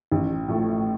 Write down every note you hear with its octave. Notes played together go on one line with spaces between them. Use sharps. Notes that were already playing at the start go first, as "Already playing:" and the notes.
A1
A2 F3 A3